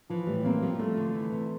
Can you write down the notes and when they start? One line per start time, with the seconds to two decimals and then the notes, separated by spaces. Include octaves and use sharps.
0.10 E3 F3
0.27 A2 G3
0.45 A#3 C4
0.62 F3 G3
0.80 F3 A3
0.97 D3
1.14 E3
1.32 C3